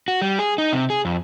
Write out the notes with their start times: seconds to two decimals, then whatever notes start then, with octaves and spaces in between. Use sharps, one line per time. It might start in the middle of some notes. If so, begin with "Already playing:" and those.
0.08 F#4
0.22 G3
0.39 G#4
0.58 D#4
0.73 C3
0.90 G#4
1.05 F2